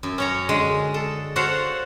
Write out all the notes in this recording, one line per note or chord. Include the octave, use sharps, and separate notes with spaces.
F#2
C#4 C#5 A#5
D3 G#3
A4
F#4 A4 C5 C#5 F5 F#5